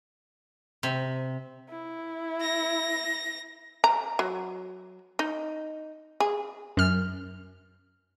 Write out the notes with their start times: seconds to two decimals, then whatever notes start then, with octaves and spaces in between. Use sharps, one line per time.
0.83 C3
1.69 E4
2.42 A#6
3.84 A#5
4.19 F#3
5.19 D#4
6.20 G#4
6.77 F#2 F6